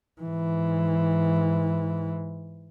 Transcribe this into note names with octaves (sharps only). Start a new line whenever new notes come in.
G#2 E3